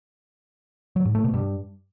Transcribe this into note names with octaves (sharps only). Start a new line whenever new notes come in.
F#3
G#2
A3
B2
G2